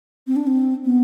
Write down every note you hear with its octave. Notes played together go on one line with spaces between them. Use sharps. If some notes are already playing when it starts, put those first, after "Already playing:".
C4
D4
C4
B3